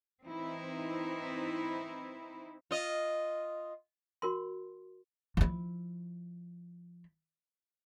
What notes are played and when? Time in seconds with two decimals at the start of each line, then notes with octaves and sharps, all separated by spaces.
0.24 E3 C4 D#4 E4
2.71 F4 D#5
4.22 F#4 A#4 C6
5.37 F3 E4